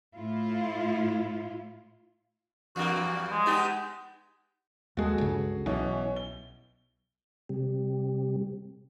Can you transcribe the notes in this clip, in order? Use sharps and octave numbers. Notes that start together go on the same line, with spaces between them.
A2 E4 F4
E2 G2 A#3 F#4
G#3
B3 D#4 G4
D#2 G#3 F#4 G#4 A4
C#2 G2 C#3
B1 B2 E3 C#4
G7
C3 G3